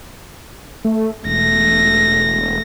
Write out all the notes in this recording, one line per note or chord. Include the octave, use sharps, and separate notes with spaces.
A3
E1 A3 A#6